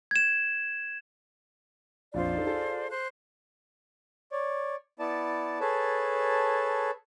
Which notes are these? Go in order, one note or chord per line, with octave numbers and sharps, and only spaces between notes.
G#6 E7
A#1 F2 F3 F4 C5 D5
D#4 A4
G#4 A4
C5 F#6
C#5 D5
B3 E4 D5 A5
G#4 A4 B4 C#5 A5